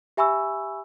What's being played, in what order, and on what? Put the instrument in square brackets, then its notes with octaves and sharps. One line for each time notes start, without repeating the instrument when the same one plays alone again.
[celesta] G4 E5 G#5 B5 C#6 E6